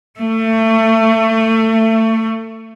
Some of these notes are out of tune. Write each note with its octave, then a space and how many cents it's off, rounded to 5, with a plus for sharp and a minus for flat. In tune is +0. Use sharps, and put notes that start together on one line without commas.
A3 +25